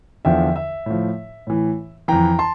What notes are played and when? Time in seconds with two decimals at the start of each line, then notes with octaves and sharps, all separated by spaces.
0.25 E2 D3 F3 E5 G5
0.56 E5
0.86 A2 F3
1.47 A2 E3
2.08 F2 E3 G5 A#5
2.39 A5 C6